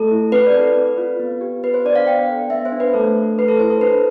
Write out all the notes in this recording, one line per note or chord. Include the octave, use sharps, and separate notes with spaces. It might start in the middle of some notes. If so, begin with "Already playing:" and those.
Already playing: A3 A4
E4
C4 B4
D5
A4
B4
C4
F4
B3
G4
B3 B4
C5
D4 D5
F5
B3 G5
A4
B3 E5
C5
D4
B4
A3 A4
A4
A3 B4
A4
E4 C5
A4
D4 B4